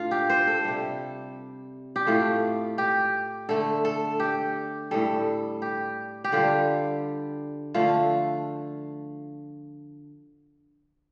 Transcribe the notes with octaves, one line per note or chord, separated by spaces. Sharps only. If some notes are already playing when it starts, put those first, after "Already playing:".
Already playing: A2 D4 F4
G4
C5
A4
C3 G3
G4
A2 A3 F4
G4
D3 A3 A4
A4
G4
A2 G3 A4
G4
G4
D3 G3 F4
D3 F3 A3 F4